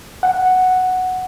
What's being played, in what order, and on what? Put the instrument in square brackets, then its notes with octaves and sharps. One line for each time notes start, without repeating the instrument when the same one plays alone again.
[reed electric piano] F#5